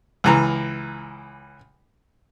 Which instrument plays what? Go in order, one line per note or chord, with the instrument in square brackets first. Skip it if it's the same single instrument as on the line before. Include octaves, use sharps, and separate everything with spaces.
[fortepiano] C#2 E3 A#5